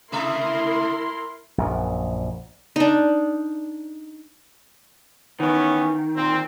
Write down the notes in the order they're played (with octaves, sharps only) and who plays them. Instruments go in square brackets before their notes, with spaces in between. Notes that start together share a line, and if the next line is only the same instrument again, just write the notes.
[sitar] C3 A3 E5 [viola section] E4 A#4 C6
[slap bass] A#1 F#2
[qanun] D4 D#4
[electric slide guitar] D#3 [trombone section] E3 B3 C#4
[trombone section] A#2 C4